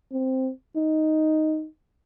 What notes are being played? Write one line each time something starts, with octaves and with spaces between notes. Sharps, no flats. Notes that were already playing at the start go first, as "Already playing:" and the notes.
C4
D#4